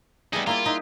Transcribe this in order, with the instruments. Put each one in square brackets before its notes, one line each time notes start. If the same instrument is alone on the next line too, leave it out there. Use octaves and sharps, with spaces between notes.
[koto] G3 A3 G#4 [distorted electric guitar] B3 D#4
[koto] A#3 E4 D5 [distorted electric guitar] F4
[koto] D#4 E4